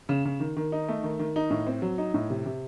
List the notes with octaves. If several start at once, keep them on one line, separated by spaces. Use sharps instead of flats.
C#3
C#3
D#3
D#3
D#4
A3
D#3
D#3
D#4
A2
C4
F#3
D#4
A2
C3
C3